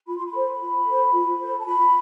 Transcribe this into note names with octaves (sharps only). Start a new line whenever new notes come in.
F4 B5
C6
B5
A4 C5
F4
A4 C5
F4
A4 C5
A5
F4 B5